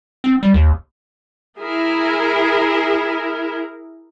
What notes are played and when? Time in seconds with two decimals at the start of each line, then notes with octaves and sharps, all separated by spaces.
0.24 C4
0.43 G3
0.54 D#2
1.58 E4 G#4 A#4